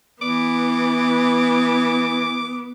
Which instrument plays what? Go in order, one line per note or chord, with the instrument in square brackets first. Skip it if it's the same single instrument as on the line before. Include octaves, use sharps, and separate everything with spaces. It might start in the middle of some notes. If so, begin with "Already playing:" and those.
[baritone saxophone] E3 [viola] B3 [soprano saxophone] D6